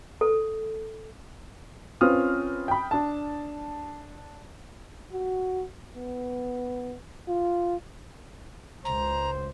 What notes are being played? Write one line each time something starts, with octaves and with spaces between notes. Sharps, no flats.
A4
C4 C#4 F4 B4 D#6 F6
G5 B5
D4 A5
F#4
B3
F4
C#2 C5 A#5